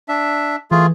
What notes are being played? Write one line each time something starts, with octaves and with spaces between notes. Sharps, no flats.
D4 E5
E3 A3 F4 G#4